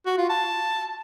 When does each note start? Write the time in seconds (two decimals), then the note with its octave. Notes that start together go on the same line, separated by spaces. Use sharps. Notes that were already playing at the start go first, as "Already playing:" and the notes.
0.06 F#4
0.18 F4
0.29 A5